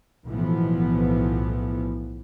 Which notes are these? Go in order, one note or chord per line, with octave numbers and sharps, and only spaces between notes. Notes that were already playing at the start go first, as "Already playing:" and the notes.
B1 A2 E3 F3 B3